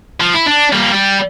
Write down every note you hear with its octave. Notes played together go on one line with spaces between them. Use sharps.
F3
E4
D4
G3 A#3
G3